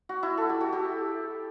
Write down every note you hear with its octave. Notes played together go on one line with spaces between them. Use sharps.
F#4
E4
A4
G4
F#4
G4